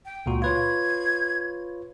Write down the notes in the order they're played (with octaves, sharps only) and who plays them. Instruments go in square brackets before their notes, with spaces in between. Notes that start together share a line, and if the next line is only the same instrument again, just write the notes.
[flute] G5
[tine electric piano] C#2 A#2 F#4
[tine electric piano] F4 B4 C#5 [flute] G#6